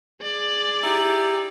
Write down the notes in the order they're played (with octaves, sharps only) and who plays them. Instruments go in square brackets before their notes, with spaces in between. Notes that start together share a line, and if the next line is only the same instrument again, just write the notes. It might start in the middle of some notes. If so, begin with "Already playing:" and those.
[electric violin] G#4 D5
[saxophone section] D#4 E4 G4